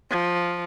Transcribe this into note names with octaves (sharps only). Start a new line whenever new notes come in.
F3